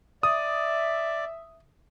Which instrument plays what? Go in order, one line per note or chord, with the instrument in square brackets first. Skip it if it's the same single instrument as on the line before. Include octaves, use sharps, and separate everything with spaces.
[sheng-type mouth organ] D5 [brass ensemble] E5 [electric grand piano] D#6